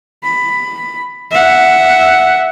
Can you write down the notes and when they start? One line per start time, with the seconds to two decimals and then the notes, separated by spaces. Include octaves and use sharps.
0.23 B5
1.31 E5 F#5